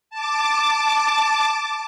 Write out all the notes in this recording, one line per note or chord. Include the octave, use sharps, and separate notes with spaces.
A5 D6